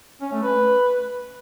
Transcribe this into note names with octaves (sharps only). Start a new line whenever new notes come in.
C#4
A3
B4